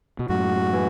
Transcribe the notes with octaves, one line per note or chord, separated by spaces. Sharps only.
B2
F#2 A2 F#4
E3